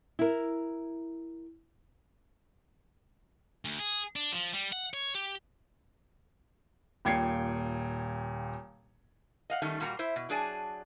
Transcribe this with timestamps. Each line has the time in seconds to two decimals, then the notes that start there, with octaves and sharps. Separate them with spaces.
0.19 E4 A#4
3.65 D2
3.79 G#4
4.16 D4
4.32 F3
4.53 G3
4.73 F#5
4.94 C#5
5.15 G4
7.05 D#1 A#2 G5 G#6 C7 C#7
9.50 D#5 F5 F#5
9.62 D#3 G3 A3 C#4 D#4
9.80 A#2 G3 A#3 F#4 A5 A#5
9.99 E4 C5 E5
10.16 B2
10.29 F#3 D4 G#4 D5 G#5 A5